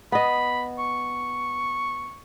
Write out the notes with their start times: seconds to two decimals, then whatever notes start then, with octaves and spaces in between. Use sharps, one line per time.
0.12 B3 D#5 B5
0.79 C#6